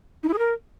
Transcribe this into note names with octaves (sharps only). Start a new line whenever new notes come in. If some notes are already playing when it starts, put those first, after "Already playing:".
D#4
E4
G#4
A#4